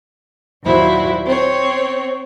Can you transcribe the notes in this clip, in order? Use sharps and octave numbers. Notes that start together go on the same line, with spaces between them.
D#2 A#2 F#3 E4 C5
C4 C#5